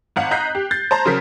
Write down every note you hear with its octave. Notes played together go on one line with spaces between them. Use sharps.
G#1 F5 F#5
D#5 A#5 F#6 G6 B6 C7
G4
G6 A6 C7
C5 A5 A#5 C6
C#3 F#3 A#4 C5 B6